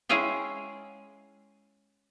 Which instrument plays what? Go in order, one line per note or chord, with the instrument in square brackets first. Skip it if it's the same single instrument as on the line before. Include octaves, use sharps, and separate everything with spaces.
[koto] G#3 C#4 E4 G#4 F5 G5